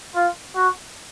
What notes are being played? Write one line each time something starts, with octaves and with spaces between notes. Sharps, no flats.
F4
F#4